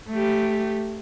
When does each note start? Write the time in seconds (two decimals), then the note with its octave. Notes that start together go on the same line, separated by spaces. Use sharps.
0.11 A3 G4